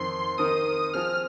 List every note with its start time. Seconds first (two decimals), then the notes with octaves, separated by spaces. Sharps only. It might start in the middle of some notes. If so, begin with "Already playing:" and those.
Already playing: F2 D#3 C4 C6
0.38 D#3 C4 D#4 A#4 D#6
0.94 F3 C4 G#4 F6